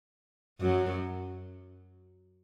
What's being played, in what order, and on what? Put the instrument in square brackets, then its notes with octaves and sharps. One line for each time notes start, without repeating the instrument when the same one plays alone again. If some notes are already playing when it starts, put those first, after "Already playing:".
[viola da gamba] F#2 F#3